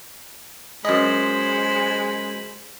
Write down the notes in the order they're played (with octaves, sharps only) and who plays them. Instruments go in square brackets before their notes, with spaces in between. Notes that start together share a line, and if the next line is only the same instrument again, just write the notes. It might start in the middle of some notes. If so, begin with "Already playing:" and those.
[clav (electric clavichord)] F#2 D#5 [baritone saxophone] G#3 [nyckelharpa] C5 B5